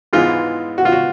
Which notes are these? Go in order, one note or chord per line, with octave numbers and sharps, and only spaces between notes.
G#2 E3 G#3 B3 F4
F#4
F4
F#4